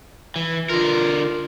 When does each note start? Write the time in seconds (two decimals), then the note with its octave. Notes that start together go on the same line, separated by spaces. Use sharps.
0.36 E3
0.69 D3 F4 A#4